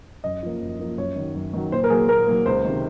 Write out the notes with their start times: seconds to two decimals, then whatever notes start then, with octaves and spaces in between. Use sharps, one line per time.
0.24 F#2 D#5
0.43 F3 A#3
0.61 F#2
0.80 F3 A#3
0.98 F#2 C#5
1.16 D#3 F#3
1.35 F#2
1.53 D#3 F#3
1.72 A#2 C5
1.84 A#4
1.90 F#3 A#3 G#4
2.08 A#2 A#4
2.27 F#3 A#3
2.46 C#2 C5
2.65 C3 D#3